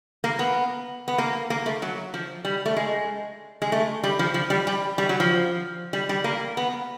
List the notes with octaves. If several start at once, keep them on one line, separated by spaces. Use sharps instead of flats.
A#3
B3
B3
A#3
A#3
A3
F#3
F3
G3
A3
G#3
G#3
A3
G3
F3
F3
G3
G3
G3
F#3
F3
G3
G3
A#3
B3